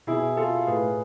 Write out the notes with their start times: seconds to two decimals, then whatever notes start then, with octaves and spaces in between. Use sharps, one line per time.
0.07 B2 E4 G#4
0.37 F4 A4
0.67 A2 G#4 B4